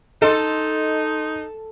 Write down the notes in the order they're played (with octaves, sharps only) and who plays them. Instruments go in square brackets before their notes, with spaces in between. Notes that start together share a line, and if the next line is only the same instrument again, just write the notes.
[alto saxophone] D#4 [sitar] A4 [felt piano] D#5 C6